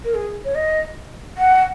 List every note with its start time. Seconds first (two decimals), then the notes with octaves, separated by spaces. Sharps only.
0.04 A#4
0.14 G#4
0.44 C#5
0.54 D#5
1.37 F#5